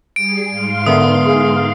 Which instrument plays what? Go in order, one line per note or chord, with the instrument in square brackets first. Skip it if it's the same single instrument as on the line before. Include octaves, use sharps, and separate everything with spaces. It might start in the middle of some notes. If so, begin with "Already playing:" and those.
[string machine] G3 G#4 C7 [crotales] D7
[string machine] G#2 F5 C6
[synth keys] D3 B3 A#4 [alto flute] E5 [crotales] D#6
[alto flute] G#4